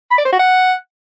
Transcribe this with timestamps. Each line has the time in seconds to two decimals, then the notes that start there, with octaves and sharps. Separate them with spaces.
0.11 B5
0.18 D5
0.25 C5
0.32 F#4
0.39 F#5